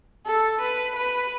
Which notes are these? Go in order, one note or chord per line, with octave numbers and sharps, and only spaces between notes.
A4
B4
B4